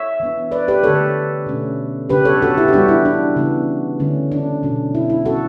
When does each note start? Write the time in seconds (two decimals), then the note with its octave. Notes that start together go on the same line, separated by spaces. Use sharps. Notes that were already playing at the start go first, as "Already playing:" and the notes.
Already playing: C#5 E5
0.20 E3 B3 D4
0.52 B4 D5
0.68 G4 B4
0.83 D3 A3 D4 A4 C#5
1.46 B2 A3 C#4
2.09 C#3 F#3 B3 D4 G4 B4
2.25 A4 C#5
2.42 F#4 A4
2.57 E4 G4
2.68 G4
2.73 E3 G3 B3 D4 F#4
2.88 E4
3.05 D4
3.36 C#3 E3 B3
3.99 D3 A3 C#4
4.32 D4
4.63 B2 F#3 C#4
4.95 E4
5.10 E4
5.25 F#3 C#4 F#4 A4